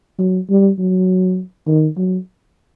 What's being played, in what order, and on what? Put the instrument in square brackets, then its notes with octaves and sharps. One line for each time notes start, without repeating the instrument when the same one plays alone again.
[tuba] F#3
G3
F#3
D#3
F#3